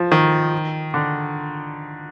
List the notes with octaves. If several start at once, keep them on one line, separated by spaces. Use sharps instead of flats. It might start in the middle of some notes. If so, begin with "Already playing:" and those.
Already playing: F3
D#3
D3